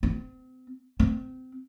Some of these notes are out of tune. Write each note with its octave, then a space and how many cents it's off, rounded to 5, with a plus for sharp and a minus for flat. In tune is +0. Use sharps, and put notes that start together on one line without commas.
C4 -35
C4 -25